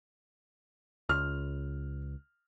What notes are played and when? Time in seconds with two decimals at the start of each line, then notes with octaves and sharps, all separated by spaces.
1.09 C#2 F6